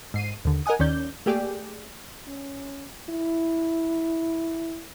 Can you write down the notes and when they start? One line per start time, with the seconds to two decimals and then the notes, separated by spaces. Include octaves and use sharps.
0.14 G#2 C7 D#7
0.45 D#2 D3
0.66 A#4 D#5 F#5 G#5 D#6
0.79 D#2 D#3 C#4 D5 G6
1.26 A3 A#3 G4 G#4 D5 G5
2.28 C#4
3.10 E4